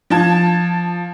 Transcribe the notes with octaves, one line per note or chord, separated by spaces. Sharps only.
F3 A5 G#6